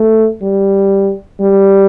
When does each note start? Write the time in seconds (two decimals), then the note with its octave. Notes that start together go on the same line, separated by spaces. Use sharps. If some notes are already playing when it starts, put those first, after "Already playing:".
Already playing: A3
0.42 G3
1.41 G3